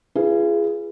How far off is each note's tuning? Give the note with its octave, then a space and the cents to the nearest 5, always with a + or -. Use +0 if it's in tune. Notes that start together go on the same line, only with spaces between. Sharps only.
F4 -40 G#4 +0 B4 -5